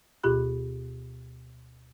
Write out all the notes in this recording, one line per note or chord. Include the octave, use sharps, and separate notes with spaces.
D2 B2 F4 G4 B5 F#6